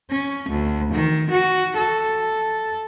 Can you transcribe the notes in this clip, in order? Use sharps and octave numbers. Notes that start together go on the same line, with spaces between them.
C#4
D2
D#3
F#4
A4